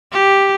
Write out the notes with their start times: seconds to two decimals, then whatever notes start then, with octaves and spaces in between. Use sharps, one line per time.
0.12 G4